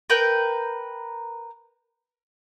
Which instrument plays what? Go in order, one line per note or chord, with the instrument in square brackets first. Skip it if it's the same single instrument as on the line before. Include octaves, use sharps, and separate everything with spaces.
[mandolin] A#4 B4 G5